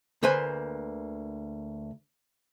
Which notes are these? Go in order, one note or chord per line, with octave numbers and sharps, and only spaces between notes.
D2 A#3 B4 C5 G#5